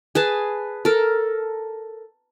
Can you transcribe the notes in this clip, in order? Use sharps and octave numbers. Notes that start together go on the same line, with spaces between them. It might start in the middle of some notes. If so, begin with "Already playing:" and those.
G#4 B4 A5
A4 A#4